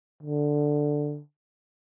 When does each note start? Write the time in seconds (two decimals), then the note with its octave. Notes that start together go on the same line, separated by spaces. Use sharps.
0.23 D3